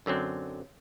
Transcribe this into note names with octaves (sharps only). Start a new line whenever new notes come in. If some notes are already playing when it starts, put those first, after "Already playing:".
F#2 D3 F#3 C4